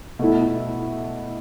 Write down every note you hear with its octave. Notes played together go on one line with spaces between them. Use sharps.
B2 A3 E4